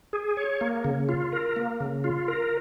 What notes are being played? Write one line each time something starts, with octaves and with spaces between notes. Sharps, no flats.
G#4
C#5
A#3
C#3
F4
A#4
A#3
C#3
F4
A#4